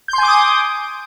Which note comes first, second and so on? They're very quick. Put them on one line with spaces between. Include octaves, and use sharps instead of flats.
G6 C6 G#5 D6 D#6